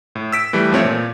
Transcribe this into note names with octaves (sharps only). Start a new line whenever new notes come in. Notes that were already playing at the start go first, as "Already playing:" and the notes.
A2
E6 B6 D7
E3 G3 A3
F3 A3 C4 C#5 E5
A#2